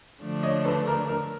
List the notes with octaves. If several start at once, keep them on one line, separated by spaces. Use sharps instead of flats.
D3 F3 A3 D4
C#5 D#5
A4 B4
A#4
A#4